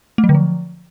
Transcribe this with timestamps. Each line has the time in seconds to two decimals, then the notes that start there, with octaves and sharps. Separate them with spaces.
0.18 A3
0.24 F#3
0.29 D3
0.35 F3